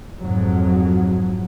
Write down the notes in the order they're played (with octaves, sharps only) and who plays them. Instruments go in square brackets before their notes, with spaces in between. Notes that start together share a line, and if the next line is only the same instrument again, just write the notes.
[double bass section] F2 G#2 F#3